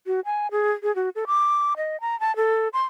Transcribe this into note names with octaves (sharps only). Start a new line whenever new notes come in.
F#4
G#5
G#4
G#4
F#4
A4
D6
D#5
A#5
A5
A4
C6